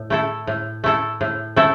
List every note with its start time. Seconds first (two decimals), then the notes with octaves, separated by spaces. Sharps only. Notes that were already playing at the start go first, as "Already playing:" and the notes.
Already playing: A2
0.10 A3 E4 A4
0.47 A2
0.84 A3 E4 A4
1.21 A2
1.56 A3 E4 A4